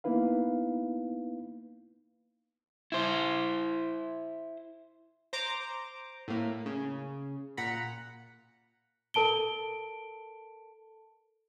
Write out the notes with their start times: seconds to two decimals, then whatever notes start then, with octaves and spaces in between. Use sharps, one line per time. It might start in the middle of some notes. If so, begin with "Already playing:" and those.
0.04 A#3 B3 D#4 E4 B4 F5
2.92 E4 C5
5.33 C5 A#5 D6
6.28 A2 A#3
6.66 C#3
7.57 A#2 F#5 A#5 B5
9.14 A4 A#4 A5 D7 G7